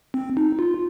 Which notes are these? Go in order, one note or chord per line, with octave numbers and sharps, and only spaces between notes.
C4
D#4
F4